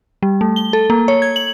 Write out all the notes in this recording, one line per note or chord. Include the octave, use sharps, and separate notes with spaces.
G3
A3
G7
A4
A#3
C#5
G#6
F#7